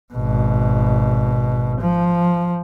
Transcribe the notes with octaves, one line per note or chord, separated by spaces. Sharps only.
G#1 B2
F3